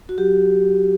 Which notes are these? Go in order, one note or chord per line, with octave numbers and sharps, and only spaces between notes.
F#4
F#3 G4